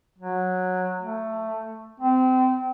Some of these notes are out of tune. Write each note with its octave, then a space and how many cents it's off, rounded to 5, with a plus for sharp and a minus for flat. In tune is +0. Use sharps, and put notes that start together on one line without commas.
F#3 -15
A3 +10
C4 -25